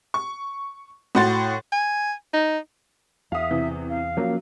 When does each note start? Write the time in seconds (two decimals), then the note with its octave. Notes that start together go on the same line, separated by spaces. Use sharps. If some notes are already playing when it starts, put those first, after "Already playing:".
0.14 C#6
1.15 A2 F#4 F#5 C6 A6
1.72 G#5
2.34 D#4
3.32 E2 E5 F5 D#6
3.51 C3 E3
3.89 F5
4.17 F3 F#3 A#3 C#4